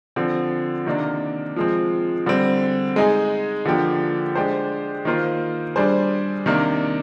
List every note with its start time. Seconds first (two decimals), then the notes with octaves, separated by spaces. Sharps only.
0.16 D3 F3 C4
0.86 C3 D#3 A#3 D4
1.56 F3 G#3 C4
2.26 D3 G3 C4
2.96 G#3 D#4 G#4
3.66 D3 F3 A#3 D4 G4
4.35 G#3 D4 G4 C5
5.05 D#3 A#3 F4 C5
5.76 G3 D4 G#4 C5
6.46 C3 D#3 A#3 D4